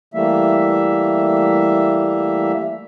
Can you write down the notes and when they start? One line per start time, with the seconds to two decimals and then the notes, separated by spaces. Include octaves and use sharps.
0.14 E3 G3 A3 A#3 E5